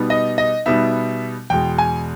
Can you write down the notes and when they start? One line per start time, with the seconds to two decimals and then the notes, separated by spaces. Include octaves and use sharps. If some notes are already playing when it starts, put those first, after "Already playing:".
Already playing: B2 G3 B3 D#4
0.10 D#5
0.38 D#5
0.66 B2 G3 B3 D#4 E5
1.50 E2 B2 G#3 G5
1.78 G#5